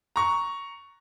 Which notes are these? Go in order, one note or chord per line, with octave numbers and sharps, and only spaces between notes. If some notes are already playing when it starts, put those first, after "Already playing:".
A#5 C#6